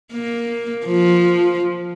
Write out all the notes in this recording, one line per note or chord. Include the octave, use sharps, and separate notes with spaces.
A#3
F3